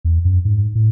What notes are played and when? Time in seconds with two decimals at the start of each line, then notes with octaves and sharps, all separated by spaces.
0.05 E2
0.25 F#2
0.45 G#2
0.75 A2